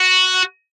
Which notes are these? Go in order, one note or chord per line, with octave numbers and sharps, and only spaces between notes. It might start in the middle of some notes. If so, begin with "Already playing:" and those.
Already playing: F#4